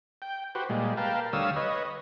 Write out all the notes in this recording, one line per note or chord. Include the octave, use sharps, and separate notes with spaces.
G5
F#4 G4 B4 C5
A#2 G3 G#3
A#4 B4 F5 G5 A5
D2 G3 C#5 F5 D#6 E6
B4 C#5 D#5